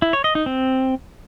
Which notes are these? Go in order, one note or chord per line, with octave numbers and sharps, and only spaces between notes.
E4
C#5
D#5
D#4
C4